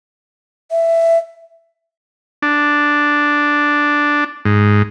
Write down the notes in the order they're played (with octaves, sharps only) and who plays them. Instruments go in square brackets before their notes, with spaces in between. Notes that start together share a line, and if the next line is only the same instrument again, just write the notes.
[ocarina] E5
[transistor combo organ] D4
G#2